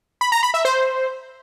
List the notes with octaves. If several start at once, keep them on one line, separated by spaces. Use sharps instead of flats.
B5
A#5
B5
E5
C5